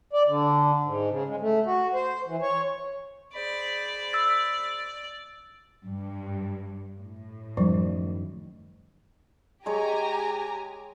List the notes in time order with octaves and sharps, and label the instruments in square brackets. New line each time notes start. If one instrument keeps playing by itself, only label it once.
[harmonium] D5
D3
G#2
C#3
G#3
A3
F#4
C5
E3
C#5
[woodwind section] G#4 C5 B5 [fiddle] D5
[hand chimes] E6 A6
[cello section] G2
A2
[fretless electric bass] F#2 D#3 [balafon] F3 G3
[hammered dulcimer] G#3 C#5 [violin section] G4 G#5 A#5